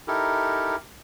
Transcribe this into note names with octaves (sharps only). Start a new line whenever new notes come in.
D#4 E4 G4 A4 A#4